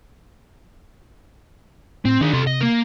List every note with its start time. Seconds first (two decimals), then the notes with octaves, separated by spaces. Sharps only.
2.05 A2 C4
2.21 D#3 D4 G#4
2.33 C3 A4 C5
2.47 D#5
2.61 A#3 A#4